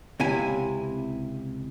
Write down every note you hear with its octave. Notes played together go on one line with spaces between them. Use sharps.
C#2 C3 E4 G#5